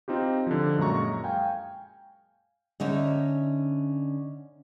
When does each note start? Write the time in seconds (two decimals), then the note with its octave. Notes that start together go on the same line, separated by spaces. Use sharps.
0.08 C4 D#4 F4 G4
0.47 D3 F3
0.78 F#2 A#2 G#3 A#5 C#6
1.24 F5 G5 G#5
2.80 D3 C#4 D#4 E5